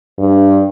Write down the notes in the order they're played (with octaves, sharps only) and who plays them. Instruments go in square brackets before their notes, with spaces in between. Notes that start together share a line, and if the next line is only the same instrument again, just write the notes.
[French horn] G2